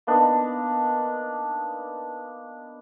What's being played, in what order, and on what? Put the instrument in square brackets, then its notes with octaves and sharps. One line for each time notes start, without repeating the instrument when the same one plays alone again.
[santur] A#3 B3 D4 D#4